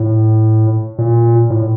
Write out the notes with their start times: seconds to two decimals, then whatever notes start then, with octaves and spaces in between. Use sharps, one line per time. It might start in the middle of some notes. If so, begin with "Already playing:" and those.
Already playing: A2
0.98 A#2
1.50 A2